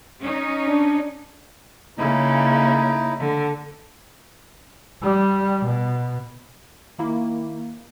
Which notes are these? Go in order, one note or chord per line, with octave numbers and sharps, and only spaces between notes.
C#4 D#4
D4
C#3 A#3 D#4 E4
D3
G3
B2
D#3 A#3 E4